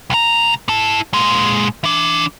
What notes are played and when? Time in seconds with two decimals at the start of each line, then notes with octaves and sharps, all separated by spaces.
0.10 C2 A#5
0.69 E4 A5
1.13 A#2 G#3
1.84 E3 D4